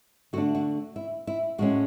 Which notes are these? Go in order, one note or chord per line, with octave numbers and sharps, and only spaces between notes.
D3 A3 D4 F#4
F#4
E4
E4
A2 G#3 C#4 F#4